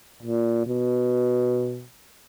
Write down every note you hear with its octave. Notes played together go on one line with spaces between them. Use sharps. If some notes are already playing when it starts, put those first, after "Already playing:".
A#2
B2